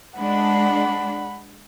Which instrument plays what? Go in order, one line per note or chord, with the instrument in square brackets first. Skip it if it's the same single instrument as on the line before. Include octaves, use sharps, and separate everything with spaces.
[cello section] G#3 D4 [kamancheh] F#5 B5